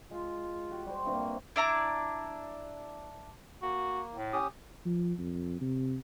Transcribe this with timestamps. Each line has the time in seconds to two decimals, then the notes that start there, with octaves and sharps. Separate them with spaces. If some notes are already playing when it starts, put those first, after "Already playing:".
0.11 G#3 F4
0.71 F#4 G4
0.86 G3 C5
1.05 G2 C3 A#3 F#4
1.56 D4 E4 A#5 D6
3.62 A#3 F#4
4.13 A2
4.33 C#4 G4 D#6
4.85 F3
5.18 F2
5.61 C3